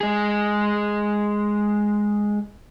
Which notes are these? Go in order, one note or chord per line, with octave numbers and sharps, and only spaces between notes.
G#3 G#4